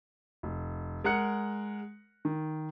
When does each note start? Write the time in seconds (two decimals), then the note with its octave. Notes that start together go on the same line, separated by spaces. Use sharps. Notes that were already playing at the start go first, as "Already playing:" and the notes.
0.43 F1
1.04 G#3 A#4 F#5 F#6 C#7
2.25 D#3